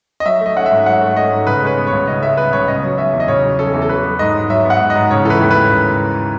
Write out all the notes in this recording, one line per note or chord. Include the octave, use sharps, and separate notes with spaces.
D#5
F#3 E5
A3
D#5
C#4 F#5
E5
G#2
F#3 F#5
A3
C#4 D#5
G#2
C#3 B4
G#3 B4 C#5
B3
C#5
C#2
C#3 D#5
G#3 E5
B3 B4
C#2 C#5
C#3 D#5
F#3
C#4 E5
E2
D#5
C#3 C#5
F#3
C#4 A4
E2
A4
F#3 B4
B3
G#2 D#5
G#2
F#3 E5
B3
F#5
G#2
D#5
G#2
C#3 C#5
E3 A4
B4
D#2
B4
D#2
C#3